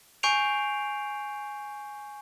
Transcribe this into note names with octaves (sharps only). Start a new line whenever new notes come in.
G#5 C#6 G6 C7 D7 F7